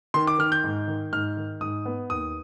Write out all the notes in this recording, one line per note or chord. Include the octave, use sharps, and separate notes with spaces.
D#3 C6
D6
D#3 F6
G6
G#2
D#3
G#2 F6
D#3
G#2 D#6
B3
D#2 D#6